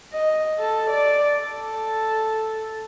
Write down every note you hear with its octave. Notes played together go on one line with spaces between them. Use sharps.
D#5
A4
D5
A4